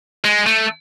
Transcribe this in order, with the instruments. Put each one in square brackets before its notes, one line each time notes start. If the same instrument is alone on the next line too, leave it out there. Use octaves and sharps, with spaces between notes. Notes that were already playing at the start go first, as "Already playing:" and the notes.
[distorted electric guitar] G#3
A3